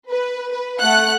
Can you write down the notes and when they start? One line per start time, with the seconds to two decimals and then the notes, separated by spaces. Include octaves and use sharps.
0.10 B4
0.51 B4
0.82 A3 F#5 F#6